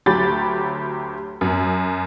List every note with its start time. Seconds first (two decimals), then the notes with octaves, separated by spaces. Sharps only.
0.06 D2 F#3 G4 B5 A6
1.41 F#2